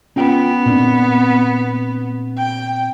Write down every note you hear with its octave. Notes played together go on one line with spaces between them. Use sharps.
B3 C#4 F4 G5
A#2 C4 D4
G5